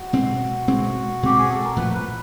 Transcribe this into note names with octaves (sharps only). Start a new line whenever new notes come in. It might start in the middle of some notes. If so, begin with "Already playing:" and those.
Already playing: F#4
B2 G#3 C4
B2 G#3 C4
B2 G#3 C4 G4
G#4
A4
A#4
A#2 F3 A3 B4
B4